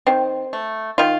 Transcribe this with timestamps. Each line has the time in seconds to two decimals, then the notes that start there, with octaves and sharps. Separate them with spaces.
0.07 D#3 C4
0.53 A3
0.98 D#3 F4